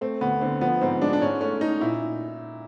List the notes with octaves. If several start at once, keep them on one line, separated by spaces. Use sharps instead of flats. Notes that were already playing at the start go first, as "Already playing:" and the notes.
A3 C4
D2 B3
D3 C4
F3 B3
G#2 C4
G#3 D4
D4
G#2 C#4
A3 C#4
A3 D#4
A#2 E4